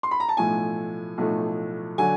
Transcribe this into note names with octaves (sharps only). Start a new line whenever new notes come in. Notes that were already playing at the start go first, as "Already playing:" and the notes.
C6
B5
A#5
A5
B1 A2 F3 A3 G#5
B1 A2 F3 A3
D3 F#3 G#5